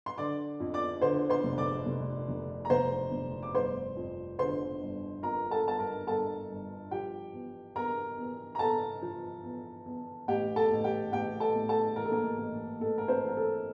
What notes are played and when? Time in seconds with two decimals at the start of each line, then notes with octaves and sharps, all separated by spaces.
0.06 C6
0.17 D3 D5 D6
0.60 F2
0.74 D5 D6
1.01 D3 C5 C6
1.30 C5 C6
1.44 F1
1.58 D5 D6
1.86 F1
2.29 F1
2.65 A#5
2.70 F1 C5 C6
3.12 F1
3.43 D6
3.55 G1 C5 C6
3.97 F2
4.38 D3 C5 C6
4.81 G1
5.23 F2 A#4 A#5
5.51 A4 A5
5.64 G1 A5
5.79 A#4 A#5
6.07 G1 A4 A5
6.49 G1
6.91 F3 G4 G5
7.33 E2
7.75 E2 A#4 A#5
8.18 E2
8.55 A#5
8.59 E2 A4 A5
9.02 F3
9.43 E2
9.85 E2
10.28 A1 G4 G5
10.56 A4 A5
10.71 A1
10.84 G4 G5
11.12 A1 G4 G5
11.40 A4 A5
11.55 A2
11.69 A4 A5
11.96 E3 A#4
12.05 A4
12.12 A#3 A#4
12.38 A1
12.80 A1 A4
12.98 A#4
13.08 C4 C5
13.23 E3
13.28 A#4
13.37 A4